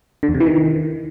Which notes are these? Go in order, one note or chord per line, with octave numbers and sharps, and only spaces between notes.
D3
E2
C3
E3
D#3